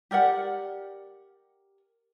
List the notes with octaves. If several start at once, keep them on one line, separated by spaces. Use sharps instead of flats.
G4 A#4 D5 F#5